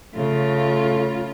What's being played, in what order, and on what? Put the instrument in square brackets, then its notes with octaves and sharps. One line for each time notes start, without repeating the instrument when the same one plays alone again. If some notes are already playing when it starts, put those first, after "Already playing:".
[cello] C#3 F4 [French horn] A3